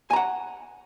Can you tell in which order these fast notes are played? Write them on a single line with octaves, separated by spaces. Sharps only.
G#5 A#5 F#5